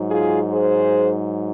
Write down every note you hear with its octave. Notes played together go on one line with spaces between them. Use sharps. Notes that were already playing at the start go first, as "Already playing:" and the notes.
Already playing: G#2 F#3
F4 G#4
G#4 C5